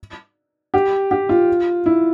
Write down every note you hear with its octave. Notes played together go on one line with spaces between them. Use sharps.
G4
G4
F4
E4